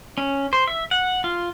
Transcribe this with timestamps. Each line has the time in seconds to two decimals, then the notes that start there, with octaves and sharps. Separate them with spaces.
0.18 C#4
0.53 C5
0.68 E5
0.91 F#5
1.24 F4